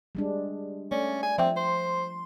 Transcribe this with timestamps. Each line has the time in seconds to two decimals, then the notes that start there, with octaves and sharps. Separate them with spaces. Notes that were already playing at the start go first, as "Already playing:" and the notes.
0.15 G3 G#3 D4
0.91 A3 C#4 D5
1.23 G#5
1.38 F3 C4 E5 G5
1.57 C5 C6